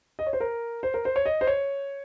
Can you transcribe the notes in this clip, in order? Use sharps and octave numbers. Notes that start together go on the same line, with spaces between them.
D#5
C#5
C5
A#4
C5
A#4
C5
C#5
D#5
C5
C#5